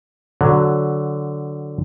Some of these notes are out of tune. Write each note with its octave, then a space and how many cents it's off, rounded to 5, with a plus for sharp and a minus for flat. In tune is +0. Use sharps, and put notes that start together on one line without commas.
D3 +0 F#3 +0